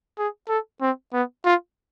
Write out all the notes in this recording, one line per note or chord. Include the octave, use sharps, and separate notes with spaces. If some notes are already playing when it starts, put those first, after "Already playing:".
G#4
A4
C4
B3
F4